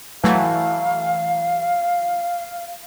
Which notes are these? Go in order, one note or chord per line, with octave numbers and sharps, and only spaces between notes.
E3 F#3 A3 F5